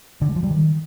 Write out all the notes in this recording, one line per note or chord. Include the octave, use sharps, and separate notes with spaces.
D3
G#3
F3
G3
D#3